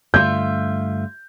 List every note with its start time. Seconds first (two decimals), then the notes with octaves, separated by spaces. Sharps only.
0.14 G2 D3 A3 F4 E5 G6